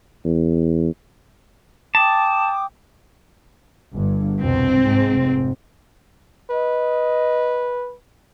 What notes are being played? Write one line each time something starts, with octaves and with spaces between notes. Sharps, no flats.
E2
G5 A5 D6 D#6
G1 G2
C2 F2 B2 C4
G#2 G#3
F1 G#2
B4 D#5